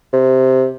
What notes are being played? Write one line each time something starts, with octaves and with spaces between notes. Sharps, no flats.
C3